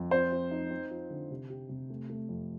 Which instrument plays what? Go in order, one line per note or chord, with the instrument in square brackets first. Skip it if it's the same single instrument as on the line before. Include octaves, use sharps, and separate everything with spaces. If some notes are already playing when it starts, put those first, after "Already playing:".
Already playing: [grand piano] F2
[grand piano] C4 [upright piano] C5
[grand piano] C4
D#4
C4
F3
D3
C3
G4
C3
A3
A3
F2